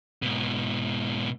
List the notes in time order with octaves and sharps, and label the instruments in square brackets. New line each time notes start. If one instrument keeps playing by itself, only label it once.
[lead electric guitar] G#2 B2